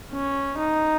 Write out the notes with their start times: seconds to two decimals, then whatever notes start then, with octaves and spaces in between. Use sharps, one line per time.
0.11 C#4
0.58 D#4